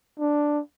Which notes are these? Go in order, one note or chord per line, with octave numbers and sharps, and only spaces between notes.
D4